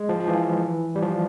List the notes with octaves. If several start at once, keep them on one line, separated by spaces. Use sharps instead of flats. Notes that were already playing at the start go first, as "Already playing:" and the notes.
Already playing: G#3
F3
F3
E3
G3
F3